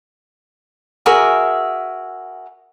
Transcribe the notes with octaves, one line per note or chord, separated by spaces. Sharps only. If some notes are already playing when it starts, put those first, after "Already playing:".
F#4 G#4 A#4 E5